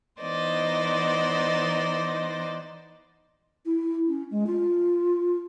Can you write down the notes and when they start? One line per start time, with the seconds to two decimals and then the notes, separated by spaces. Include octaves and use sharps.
0.21 E3 B3 D#4 C5 D5 D#5
3.65 E4
4.07 C#4
4.30 G#3
4.46 F4